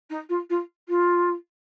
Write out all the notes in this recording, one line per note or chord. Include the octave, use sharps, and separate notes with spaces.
D#4
F4
F4
F4